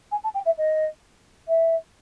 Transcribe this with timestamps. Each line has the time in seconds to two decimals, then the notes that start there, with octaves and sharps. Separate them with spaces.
0.11 G#5
0.24 A5
0.34 G5
0.46 E5
0.58 D#5
1.48 E5